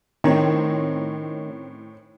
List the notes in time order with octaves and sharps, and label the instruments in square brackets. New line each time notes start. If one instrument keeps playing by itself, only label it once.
[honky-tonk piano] A2 C4 C#4 [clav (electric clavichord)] D#3